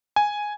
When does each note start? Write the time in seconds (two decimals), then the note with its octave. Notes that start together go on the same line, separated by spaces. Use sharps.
0.16 G#5